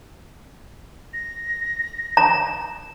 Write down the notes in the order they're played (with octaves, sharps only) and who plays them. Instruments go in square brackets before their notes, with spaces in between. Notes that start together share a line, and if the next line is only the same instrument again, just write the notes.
[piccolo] A#6
[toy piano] A#5